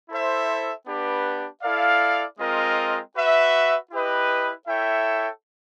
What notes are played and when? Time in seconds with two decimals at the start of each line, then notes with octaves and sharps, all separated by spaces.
0.09 E4 A4 C5 E5
0.85 B3 D4 G4 B4
1.62 E4 A4 D5 F5
2.38 G#3 C4 F4 A#4 D#5
3.15 F#4 B4 E5
3.91 E4 G4 B4 D#5
4.67 E4 A4 C#5 E5 G5